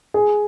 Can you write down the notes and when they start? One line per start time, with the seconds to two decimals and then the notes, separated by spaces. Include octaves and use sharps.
0.14 G#4